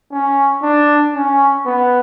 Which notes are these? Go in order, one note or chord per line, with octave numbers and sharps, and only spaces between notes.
C#4
D4
C#4
B3